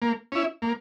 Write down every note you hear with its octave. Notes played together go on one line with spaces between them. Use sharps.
A#3
C#4 E4
A#3